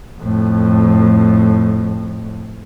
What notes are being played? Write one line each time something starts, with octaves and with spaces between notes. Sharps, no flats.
F2 A2